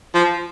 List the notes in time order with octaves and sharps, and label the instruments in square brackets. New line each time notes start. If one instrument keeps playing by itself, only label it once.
[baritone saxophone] F3